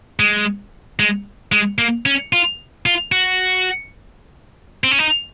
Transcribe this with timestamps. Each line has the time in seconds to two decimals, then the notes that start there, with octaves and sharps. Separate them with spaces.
0.20 G#3
0.99 G#3
1.52 G#3
1.78 A#3
2.06 C#4
2.33 F4
2.86 F4
3.12 F#4
4.84 C4
4.91 C#4
4.99 D#4